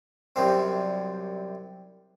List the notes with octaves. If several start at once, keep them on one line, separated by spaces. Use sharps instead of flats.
C2 F#2 G3 C4